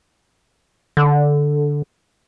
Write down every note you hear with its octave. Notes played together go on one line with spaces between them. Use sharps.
D3